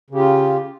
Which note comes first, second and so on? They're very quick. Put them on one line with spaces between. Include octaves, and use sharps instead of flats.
C#3 G4 F4